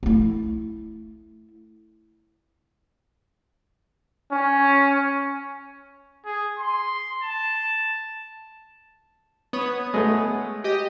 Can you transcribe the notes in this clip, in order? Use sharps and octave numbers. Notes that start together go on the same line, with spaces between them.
A3 E4
C#4
G#4
C6
A5
B3 C#5 D#6
G#3 A3
G4 D#5